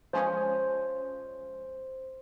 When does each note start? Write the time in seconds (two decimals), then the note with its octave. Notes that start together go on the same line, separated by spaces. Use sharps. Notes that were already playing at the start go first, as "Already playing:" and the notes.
0.13 F3 G#3 C#4 C5